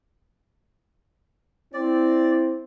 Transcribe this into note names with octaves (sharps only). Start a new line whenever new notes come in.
C4 E4 D5